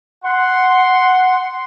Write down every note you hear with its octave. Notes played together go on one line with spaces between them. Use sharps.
F#5 C6